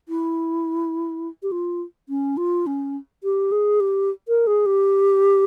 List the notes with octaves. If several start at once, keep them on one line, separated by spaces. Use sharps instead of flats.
E4
G4
F4
C#4
F4
C#4
G4
G#4
G4
A#4
G#4
G4